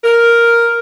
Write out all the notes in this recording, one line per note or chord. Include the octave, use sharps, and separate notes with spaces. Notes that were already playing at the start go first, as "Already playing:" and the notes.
A#4